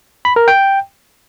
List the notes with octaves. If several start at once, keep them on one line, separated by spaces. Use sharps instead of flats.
B5
A#4
G5